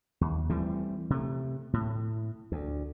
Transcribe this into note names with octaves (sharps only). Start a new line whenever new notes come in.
D#2
E3 G3 A3 C4
C3 A3
A2
D2